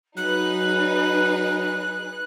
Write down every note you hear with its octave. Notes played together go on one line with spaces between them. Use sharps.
F#3 D#4 G#4 B4 F#6